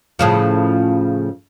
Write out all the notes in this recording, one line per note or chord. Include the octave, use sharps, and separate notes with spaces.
A2 C#3 F3